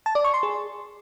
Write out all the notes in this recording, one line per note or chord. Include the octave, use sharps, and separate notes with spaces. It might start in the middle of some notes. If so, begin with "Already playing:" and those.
A5
D5
C#6
C6
G#4